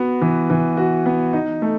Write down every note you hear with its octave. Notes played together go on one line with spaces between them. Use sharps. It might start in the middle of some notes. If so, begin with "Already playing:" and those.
Already playing: B3 F#4
E3
E3
F#4
B3
D#4
A3